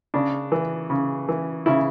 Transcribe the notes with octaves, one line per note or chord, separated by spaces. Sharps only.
C#3 D4
E3
C#3
E3
C#3 E4